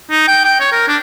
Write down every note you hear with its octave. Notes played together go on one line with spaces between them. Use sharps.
D#4
G5
G5
C#5
A#4
D4